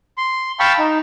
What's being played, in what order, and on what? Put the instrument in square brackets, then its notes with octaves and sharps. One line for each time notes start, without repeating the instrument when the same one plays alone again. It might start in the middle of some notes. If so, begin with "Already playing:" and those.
[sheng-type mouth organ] C6
F5 G5 A5 B5 C#6 E6
D#4